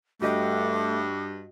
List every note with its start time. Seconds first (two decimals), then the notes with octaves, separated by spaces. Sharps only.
0.22 G2 A3 F#4 D#5 G5 D6